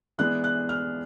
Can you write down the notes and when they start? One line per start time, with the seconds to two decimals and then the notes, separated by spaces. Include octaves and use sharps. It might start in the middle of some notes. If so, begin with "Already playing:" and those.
0.18 E3 G#3 B3 D4 F#6
0.44 F#6
0.69 F6